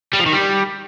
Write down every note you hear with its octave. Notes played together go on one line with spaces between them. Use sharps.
G3
F3
D#3
G3